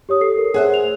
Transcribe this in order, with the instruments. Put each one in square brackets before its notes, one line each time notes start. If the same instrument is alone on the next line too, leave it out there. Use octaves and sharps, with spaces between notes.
[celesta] G4 C#5 D#6
A4 C7
A#4
[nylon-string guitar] G#4 C5 E5 [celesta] C#5 F#5 F#6
[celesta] F7